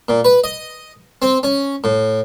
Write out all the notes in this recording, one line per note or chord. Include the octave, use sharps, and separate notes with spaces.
A#2
B4
D#5
C4
C#4
A2